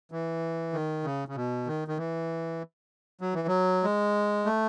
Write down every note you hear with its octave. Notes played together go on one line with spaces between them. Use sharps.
E3
D#3
C#3
C#3
B2
D#3
D#3
E3
F#3
E3
F#3
G#3
A3